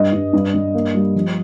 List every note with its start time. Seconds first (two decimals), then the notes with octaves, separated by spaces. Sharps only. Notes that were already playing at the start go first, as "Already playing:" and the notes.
Already playing: G2 D#5
0.13 G2
0.33 G2
0.54 G2
0.74 A#3
0.95 G3
1.15 F3